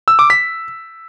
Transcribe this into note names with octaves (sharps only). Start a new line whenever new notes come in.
E6
D6
B6